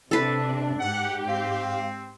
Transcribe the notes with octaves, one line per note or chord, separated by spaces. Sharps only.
C3 D4 A4 B4
G#2 G4 F#5
C4 F5